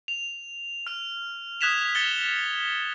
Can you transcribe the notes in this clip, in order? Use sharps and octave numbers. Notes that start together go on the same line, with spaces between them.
F7
F6 F7
D#6 F#6 G#6 B6 E7 F7
F6 A6 C#7 G7